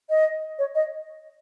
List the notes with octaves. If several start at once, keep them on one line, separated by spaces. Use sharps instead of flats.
D#5
C#5
D#5